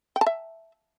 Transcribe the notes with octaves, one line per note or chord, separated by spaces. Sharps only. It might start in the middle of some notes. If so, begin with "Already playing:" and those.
G5
A5
E5